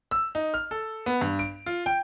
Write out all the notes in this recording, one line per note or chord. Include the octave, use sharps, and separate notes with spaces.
E6
D#4
F6
A4
B3
G2
D7
F4
G5